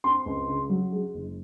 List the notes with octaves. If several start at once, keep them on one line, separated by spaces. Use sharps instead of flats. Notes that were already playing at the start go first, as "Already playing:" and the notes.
C4 C6
C#2
C#3
F#3
G#3
F#1